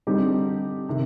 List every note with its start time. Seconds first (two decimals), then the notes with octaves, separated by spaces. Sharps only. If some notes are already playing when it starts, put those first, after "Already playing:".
0.07 D3 G3 C4 D#4 G4
0.89 C3 D#3